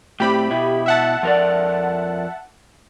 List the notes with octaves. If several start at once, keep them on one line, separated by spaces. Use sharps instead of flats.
A2 C4 G4 B5
B2 E4
E5 F#5 A5
F2 A#4 D5